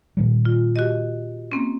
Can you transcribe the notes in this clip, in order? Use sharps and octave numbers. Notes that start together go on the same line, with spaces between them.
A#2 D#3 G3
F4
F#4 G4 D#5
A#3 C4 C#4